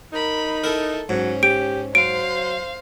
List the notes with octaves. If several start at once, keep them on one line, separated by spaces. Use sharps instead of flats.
D#4 A#4 B5
E4 A4 A#4
G#2 F#3 C#4
G4 D7
F#3 C5 F5 D7